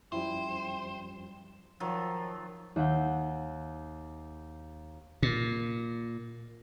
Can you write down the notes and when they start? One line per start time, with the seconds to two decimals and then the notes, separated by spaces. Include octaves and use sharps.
0.12 F#2 F3 G3 E4 C5 G5
1.80 D#3 F3 F#3 F4
2.76 D#2 E5 F#5 G6
5.23 A#2